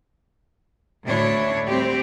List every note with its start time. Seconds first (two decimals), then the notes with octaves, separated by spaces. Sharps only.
1.04 D2 A2 D4 E4 C#5
1.67 G3 C4 G4